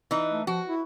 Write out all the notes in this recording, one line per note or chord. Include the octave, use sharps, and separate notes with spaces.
E3 D#4
A3
F3 F#4
E4